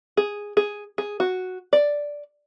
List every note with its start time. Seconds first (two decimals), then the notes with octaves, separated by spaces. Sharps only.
0.17 G#4
0.57 G#4
0.98 G#4
1.20 F#4
1.73 D5